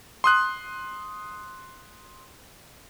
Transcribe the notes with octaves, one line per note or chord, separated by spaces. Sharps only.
C6 D#6 F#6